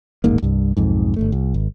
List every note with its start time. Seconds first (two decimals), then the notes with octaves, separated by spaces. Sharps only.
0.24 D#1 A1 G#2 A#3
0.43 C2 G2
0.77 B1 F2 G#2
1.16 G1 F2 A3
1.32 C2
1.54 G#1